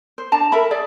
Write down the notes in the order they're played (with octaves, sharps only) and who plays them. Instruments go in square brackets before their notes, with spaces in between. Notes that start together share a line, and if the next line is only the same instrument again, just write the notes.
[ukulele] C5
D4 A5 A#5
A4 A#4 E5 B5
G#4 D5 E5